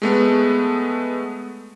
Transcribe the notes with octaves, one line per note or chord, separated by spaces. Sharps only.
G#3 A3 B3